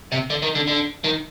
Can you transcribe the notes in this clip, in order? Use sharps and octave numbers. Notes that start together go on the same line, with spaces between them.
C3
D3
D#3
D3
D3
D#3